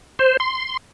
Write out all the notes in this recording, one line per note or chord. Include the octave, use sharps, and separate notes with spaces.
C5
C6